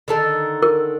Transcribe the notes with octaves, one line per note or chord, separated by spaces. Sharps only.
D3 D#3 A4
A#4